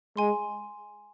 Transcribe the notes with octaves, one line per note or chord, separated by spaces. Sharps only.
G#3 G#5 C6